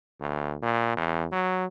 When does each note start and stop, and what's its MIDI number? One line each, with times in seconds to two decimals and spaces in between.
0.20 0.56 38
0.63 0.92 46
0.97 1.27 40
1.32 1.66 54